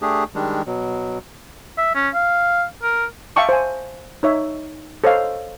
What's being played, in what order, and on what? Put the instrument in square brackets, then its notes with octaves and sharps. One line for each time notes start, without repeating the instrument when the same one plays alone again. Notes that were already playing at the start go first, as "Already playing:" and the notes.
[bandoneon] A3 D4 G4 G#4
D#3 G3 G#3 D4
B2 F#3
[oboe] E5
C#4
F5
A#4
[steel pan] E5 F5 G5 A5 C#6 D6
C5 G#5
D#4 C#5 E5
A4 C5 C#5 D#5 F5